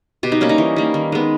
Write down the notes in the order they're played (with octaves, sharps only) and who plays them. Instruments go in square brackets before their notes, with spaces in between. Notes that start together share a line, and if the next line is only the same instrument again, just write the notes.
[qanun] B2 G4
D#4
G3 A#3 C#4
D#4
E3
G3 A#3
D#3
G#3 B3